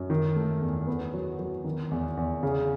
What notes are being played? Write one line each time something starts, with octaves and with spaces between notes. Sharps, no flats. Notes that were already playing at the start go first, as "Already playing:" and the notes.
Already playing: F#2
D#3
A3
E2
B3
F#3
F#3
D#3
E2
E2
C#3